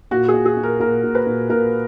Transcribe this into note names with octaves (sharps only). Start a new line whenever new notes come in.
A#2 F#4
G#4
A#2
G#4
A#2
A#4
A#2 A#4
A#2
B4
A#2
A#2 A#4